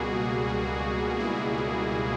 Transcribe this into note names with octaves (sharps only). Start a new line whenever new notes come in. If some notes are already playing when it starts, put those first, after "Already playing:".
Already playing: C#2 B2 G3 A#3 F#4 G#4
E4 F#4